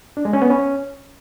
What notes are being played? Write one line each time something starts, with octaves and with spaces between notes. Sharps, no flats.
D4
G#3
C#4
B3
C#4